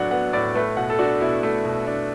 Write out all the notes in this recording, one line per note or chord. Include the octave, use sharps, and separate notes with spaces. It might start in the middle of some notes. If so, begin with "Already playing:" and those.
Already playing: A2 F#3 B3 D4 F#5
B3 F#5
A2 D5
A3 B4
B2 F#5
A4
D4 F#4
B2 E4
A3
B2
D4